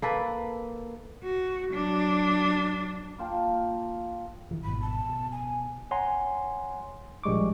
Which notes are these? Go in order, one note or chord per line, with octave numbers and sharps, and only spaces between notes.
A#3 A4 B4
F#4
F#3 D4
A#3 F4 G5 A5
D#3 E3
G#1 B2 B5
A5
B2
G#5
C#5 F#5 G#5 A#5 C6
A#1 G3 G#3 C#6 D6